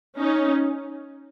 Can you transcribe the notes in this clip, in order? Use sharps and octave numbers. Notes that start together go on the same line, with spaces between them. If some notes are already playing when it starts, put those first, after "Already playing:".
C#4 D#4